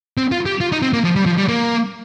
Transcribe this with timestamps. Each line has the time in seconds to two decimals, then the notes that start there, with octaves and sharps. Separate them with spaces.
0.17 C4
0.32 F4
0.46 G4
0.61 F4
0.72 D#4
0.82 C4
0.93 A#3
1.04 F3
1.16 G3
1.26 F3
1.38 G3
1.48 A#3